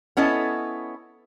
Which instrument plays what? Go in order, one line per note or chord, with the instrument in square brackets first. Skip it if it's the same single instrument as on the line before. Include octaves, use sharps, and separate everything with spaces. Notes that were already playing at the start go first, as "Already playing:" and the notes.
[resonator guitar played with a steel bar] B3 C#4 E4 A4 D#5